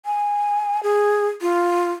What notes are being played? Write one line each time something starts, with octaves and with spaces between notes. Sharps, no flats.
G#5
G#4
F4